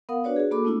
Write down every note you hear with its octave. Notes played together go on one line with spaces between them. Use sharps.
B3 A#4 F5 F#5 D#6
D4 F#4 B4 C#5 D5
F#4 G#4
A#3 F#4 A4 B5 D6
A3 B3 D4 E4 F4 D6